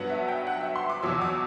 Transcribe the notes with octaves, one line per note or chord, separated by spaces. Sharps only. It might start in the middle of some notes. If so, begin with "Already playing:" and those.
Already playing: G2 F#3 B3 F#5
E5
G5
F#5
E5
C6
D6
E2 B2 F#3 E6
D6